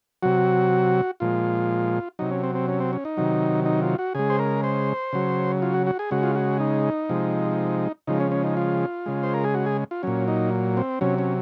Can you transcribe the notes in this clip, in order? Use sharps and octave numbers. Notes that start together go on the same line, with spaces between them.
C3 F#3 F#4
A#2 F3 G#3 F4
C3 F#3 D#4
C#4
C4
C4
C#4
C4
C#4
D#4
C3 D#3 F#3
D#4
F4
F#4
C#3 G#3 G#4
C5
A#4
C5
C#3 F#3
F4
F#4
F#4
G#4
C#3 G#3 F#4
F4
F#4
D#4
C3 F3 G#3
C#3 F3 G#3 D#4
C#4
C#4
D#4
F4
C#3 G#3
C5
A#4
G#4
F#4
G#4
F4
A#2 F#3 C#4
D#4
C4
C3 F#3 C#4
C#4